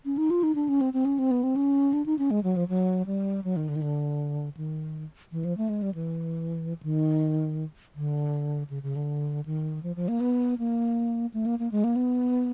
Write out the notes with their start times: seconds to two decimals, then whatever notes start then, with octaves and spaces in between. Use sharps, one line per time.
0.05 C#4
0.18 D#4
0.30 F4
0.43 D#4
0.55 D4
0.69 C#4
0.81 C4
0.93 C4
1.05 C#4
1.19 C4
1.31 B3
1.43 C4
1.56 C#4
1.93 D4
2.06 D#4
2.19 C#4
2.31 G#3
2.44 F#3
2.56 F3
2.69 F#3
3.06 G3
3.44 F#3
3.56 D#3
3.69 D3
3.76 D#3
3.82 D3
4.57 D#3
5.32 E3
5.45 F3
5.57 A3
5.69 G#3
5.82 G3
5.95 E3
6.83 D#3
7.96 D3
8.70 C#3
8.83 C#3
8.96 D3
9.46 D#3
9.83 F3
9.96 F3
10.08 A#3
10.20 B3
10.59 A#3
11.34 A3
11.46 A#3
11.59 A#3
11.72 G#3
11.84 A#3
11.96 B3